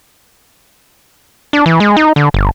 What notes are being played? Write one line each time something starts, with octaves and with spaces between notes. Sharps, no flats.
D4
E3
G#3
D#4
D3
G1